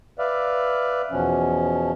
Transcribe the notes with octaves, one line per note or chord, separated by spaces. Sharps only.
B4 D5 E5 F5
E2 B2 F3 C#4